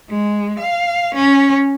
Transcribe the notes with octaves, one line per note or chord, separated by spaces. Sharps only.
G#3
F5
C#4